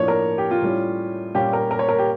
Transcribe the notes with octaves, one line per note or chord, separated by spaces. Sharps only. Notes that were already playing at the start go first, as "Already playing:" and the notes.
Already playing: A2 F3 A#3 D4 C#5
A#4
G4
F4
A2 G3 C#4
A#2 G3 A#3 C#4 G4
A#4
A#4
C#5
A#4
G4